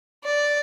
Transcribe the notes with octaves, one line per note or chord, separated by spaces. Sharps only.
D5